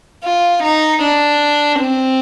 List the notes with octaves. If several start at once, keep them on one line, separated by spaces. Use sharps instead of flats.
F4
D#4
D4
C4